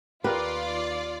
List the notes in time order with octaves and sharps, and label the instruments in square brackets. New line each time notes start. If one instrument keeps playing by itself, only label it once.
[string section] D#2 F4 D5 [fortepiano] G4 A#4 [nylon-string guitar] B4